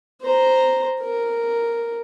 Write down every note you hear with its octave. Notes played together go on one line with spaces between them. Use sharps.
C5 A#5
A#4